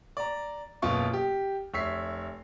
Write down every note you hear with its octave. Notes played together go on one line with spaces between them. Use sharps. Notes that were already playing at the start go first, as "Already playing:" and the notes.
D5 A#5
F#1 B2 F4 C#6
G4
F1 C#5 E5 B6 C7